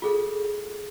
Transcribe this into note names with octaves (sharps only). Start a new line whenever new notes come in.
F4 G#4 A4